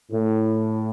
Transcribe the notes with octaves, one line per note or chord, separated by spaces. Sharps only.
A2